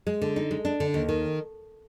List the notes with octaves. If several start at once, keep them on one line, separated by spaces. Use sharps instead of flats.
G#3
D3
D#4
G#3
D4
D3
D#2
D#3